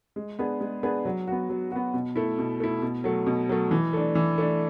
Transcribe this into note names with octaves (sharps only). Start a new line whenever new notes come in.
G#3
B3 D4 G#4 B4
G#3
B3 D4 G#4 B4
F#3
B3 F#4
F#3
B3 F#4
B2
A3 E4
B2
A3 E4
B2
F#3 A3
B2
F#3 A3
E3
A3 D4
E3
A3 D4